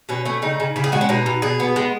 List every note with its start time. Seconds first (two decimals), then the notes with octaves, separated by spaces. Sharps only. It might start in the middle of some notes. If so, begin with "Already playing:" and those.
0.09 B2 C#4
0.25 A3 C#4
0.42 C#3 D#4
0.60 C#3
0.76 C#3 E4
0.84 G#4
0.92 G#3 F#4
1.01 C#4
1.09 B2 D#4
1.26 B2
1.42 B2 G#4
1.60 B3
1.76 G#3